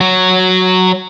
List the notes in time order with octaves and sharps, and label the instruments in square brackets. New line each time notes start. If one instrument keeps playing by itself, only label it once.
[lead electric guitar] F#3 F#4